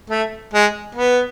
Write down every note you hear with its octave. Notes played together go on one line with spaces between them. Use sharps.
A3
G#3
B3